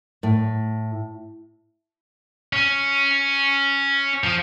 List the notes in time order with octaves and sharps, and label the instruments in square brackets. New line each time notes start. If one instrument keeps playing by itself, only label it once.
[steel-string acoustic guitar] A2
[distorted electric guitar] C#4
F3